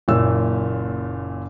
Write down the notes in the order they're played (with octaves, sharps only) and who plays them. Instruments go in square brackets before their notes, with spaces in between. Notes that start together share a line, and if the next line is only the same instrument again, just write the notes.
[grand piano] F#1 F#2 A#2 E6